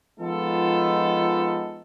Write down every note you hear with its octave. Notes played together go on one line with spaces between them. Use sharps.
F3 G#3 B3 D#4 F4 A4